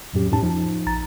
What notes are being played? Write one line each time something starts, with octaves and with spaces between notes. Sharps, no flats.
F2 A2 F#3 C#4 G4
F2 A2 C#4 D#4 G4 A5
F3 D#4
A#1 A#5 A6